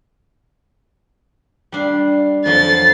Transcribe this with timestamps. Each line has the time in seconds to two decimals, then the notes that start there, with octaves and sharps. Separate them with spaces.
1.72 G3 D4 F5
2.46 F2 F3 F#3 A6 C7